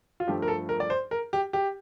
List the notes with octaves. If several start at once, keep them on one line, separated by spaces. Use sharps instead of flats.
F4
G2 F3 A3 G4
A#4
A4
A#4
D5
C5
A#4
G4
G4